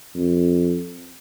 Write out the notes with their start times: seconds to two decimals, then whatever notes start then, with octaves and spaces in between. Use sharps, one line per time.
0.15 F2